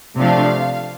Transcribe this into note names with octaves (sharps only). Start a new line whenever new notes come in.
C3 F3 A3 D4 F5